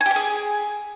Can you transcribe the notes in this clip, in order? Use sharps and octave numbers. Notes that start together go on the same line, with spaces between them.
G#5
G4
G#5
G#4